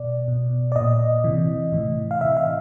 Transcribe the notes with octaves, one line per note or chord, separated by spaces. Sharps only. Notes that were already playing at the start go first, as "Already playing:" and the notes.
Already playing: B2 D5
B2
D5
A#2 D#5
C3 E3
A2 E3
F5
C3 E3 E5
F5